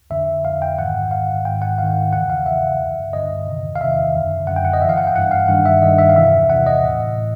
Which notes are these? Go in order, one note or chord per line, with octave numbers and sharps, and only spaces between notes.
F2 D3 E5
F2 D3 F5
G5
G#2 D#3 F#5
G#2 D#3 F5
G#2 D#3 G5
F#5
G#2 D#3 F5
E2 C#3 E3 F#5
F5
E2 C#3 E3 E5
G2 D3
G2 D3 D#5
E2 C3 D#3
F5
E2 C3 D#3 E5
F#2 D3
F#2 D3 F#5
G5
F#5
D#5
G2 E3 E5 F5
F#5
G5
G2 E3 F#5
F5
G2 D#3 F#5
E5
G2 D#3 D#5
E5
F5
E2 C3 E3 E5
E2 C3 E3 F#5
D#5
A2 E3
A2